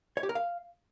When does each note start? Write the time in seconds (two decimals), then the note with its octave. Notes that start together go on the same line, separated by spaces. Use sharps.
0.17 C#5
0.23 G4
0.29 A#4
0.35 F5